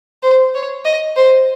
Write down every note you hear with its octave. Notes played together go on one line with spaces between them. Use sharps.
C5
C#5
D#5
C5